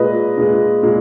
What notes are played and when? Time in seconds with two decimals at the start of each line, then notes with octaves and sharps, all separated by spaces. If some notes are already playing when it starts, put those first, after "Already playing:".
Already playing: A#2 G#3 B4 D#5
0.37 A#2 G#3
0.83 A#2 G#3